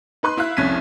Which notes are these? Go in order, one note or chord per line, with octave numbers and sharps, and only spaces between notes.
D#4 B4 C6 F#6
E4 E5 F5 F#6
C2 F2 C#4 G#6 B6 D#7